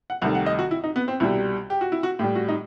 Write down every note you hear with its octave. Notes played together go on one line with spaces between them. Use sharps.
F#5
C2 C3 D#3 A3 F#5
F#5
D#5
F#4
E4
D#4
B3
C4
C2 B2 G3 E4
G4
F#4
E4
F#4
A2 G3 G4
F#4
D#4